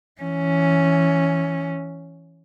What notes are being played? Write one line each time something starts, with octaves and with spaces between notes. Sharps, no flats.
E3 C#4